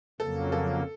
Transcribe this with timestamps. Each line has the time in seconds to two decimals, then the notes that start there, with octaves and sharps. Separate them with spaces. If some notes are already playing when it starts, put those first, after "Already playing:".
0.20 F2 C#3 F#3 A#3 A4
0.52 A4